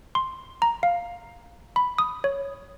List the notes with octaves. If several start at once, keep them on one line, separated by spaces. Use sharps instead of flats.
C6
A#5
F5
B5
D#6
C#5